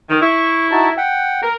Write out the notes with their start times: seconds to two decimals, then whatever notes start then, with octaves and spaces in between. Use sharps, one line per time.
0.10 D#3
0.21 E4 C#6
0.71 D#4 F#4 A5
0.97 F#5 G5
1.43 A#4